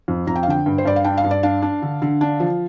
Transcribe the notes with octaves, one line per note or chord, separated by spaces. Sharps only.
F2
F2 A#5
G5
F5
D3 G5
G2
C5
G2 D5
F5
D4 G5
F5
G2
D5
D4 F5
D4
D3
D3
D4
F3